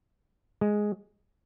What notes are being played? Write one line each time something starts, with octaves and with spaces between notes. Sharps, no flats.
G#3